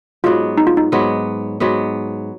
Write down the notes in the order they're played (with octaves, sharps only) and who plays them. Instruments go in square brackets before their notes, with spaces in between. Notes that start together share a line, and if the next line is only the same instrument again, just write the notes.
[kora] G#2 F#3 B3 [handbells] F4
[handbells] D#4
F4
D#4
[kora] G#2 F#3 B3
G#2 F#3 B3